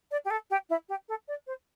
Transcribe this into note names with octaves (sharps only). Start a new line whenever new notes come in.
D5
G4
A4
G4
E4
G4
A4
D5
C5